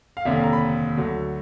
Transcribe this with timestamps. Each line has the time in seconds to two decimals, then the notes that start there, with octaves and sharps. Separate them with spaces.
0.17 F5
0.25 F1 D#2 D3 E5
0.35 F5
0.43 A#5
0.53 B5
0.97 D2 D3 F#3